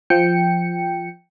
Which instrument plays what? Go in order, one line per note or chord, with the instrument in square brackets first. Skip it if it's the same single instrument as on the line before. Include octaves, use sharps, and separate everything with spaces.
[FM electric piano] F3 G5 C#7